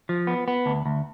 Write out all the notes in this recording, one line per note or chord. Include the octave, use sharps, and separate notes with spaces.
F3
B3
B3
D2
D2